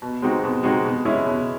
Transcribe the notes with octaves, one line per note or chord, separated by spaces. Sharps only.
B2
G#3 C4 D#4 F#4
B2
G#3 C4 D#4 F#4
B2
G#3 C#4 E4
B2